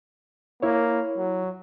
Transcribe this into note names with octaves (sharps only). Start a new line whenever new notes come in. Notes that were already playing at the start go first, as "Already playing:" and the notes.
A#3 E4 C#5
F#3